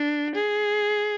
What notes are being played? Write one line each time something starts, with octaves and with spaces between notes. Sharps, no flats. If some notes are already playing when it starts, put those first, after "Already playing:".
Already playing: D4
G#4